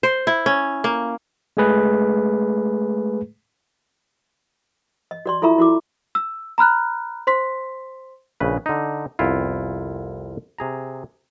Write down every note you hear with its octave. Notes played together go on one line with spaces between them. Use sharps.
C5
E4
C#4
A#3
G#3 A3 G#4 B4
D#5
F#4 D5 C6
E4 F4 A4 E5 A#5 C#6
E4 F#4 D6
E6
A#5 B5 F6 F#6
C5 C6 B6
A#1 C#3 B4
D3 D#4
C2 F2 B3 E4 F4
C3 G#4 A#5